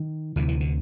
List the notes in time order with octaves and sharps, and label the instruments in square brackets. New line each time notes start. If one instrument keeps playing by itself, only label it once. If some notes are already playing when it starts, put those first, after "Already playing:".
Already playing: [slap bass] D#3
D2 C3 E3
E3
D3